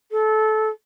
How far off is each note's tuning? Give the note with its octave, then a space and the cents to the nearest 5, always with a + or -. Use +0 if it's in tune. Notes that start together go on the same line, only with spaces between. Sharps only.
A4 -20